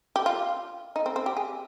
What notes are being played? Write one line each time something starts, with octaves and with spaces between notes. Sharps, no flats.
G4
F4
D#4
C4
C4
G4
G#4